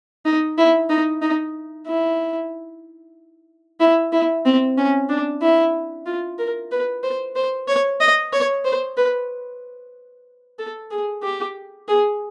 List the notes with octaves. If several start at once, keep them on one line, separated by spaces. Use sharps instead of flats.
D#4
E4
D#4
D#4
E4
E4
E4
C4
C#4
D4
E4
F4
A#4
B4
C5
C5
C#5
D#5
C#5
C5
B4
A4
G#4
G4
G#4